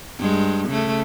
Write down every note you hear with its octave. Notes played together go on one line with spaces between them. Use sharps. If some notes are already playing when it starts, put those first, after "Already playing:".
G2 G#3
C#3 A3